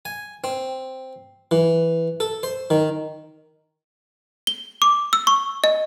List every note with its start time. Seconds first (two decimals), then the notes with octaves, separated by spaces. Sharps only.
0.05 G#5
0.44 C4
1.51 E3
2.20 A4
2.43 C5
2.70 D#3
4.47 G7
4.82 D6
5.13 E6
5.27 C#6
5.64 D#5